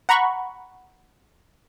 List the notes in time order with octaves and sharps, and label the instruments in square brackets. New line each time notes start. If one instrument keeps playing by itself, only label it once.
[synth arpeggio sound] F#5 A#5 B5 C#6